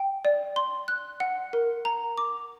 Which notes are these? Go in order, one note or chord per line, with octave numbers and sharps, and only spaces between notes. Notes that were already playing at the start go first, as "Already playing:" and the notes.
Already playing: G5
D5
C6
F#6
F#5
A#4
A#5
D6